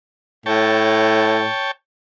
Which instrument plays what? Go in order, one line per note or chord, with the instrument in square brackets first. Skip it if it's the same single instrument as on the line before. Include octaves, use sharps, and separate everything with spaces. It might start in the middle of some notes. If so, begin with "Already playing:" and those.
[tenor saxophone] A2 [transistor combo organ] C#5 G5 A5